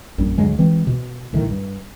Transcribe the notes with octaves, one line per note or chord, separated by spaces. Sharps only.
A#1 F#2 G3 D4
D2 G2 F#3 G#3
E3 G#3 C4
B2
B1 A2 D#3
G2